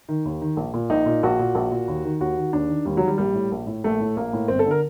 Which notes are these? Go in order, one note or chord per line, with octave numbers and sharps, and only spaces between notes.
D#3
D#2
D#3
A#1
A#2
A#1 D#4
A#2
A#1 F#4
A#2
A#1
A#2
D#2
D#3
D#2 F#4
D#3
D#2 D4
D#3
D#2 G3
F#3
D#3
G3
A#1 G3
A2
A#1
A2
A#1 A3
A2
A#1 A#3
A2
G1 C4
A4
D3 A#4